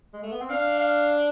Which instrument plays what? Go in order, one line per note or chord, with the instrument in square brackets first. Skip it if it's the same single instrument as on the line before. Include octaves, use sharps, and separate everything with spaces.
[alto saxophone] G#3
A3
B3
C4
[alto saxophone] D4 [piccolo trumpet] F5
[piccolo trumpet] F5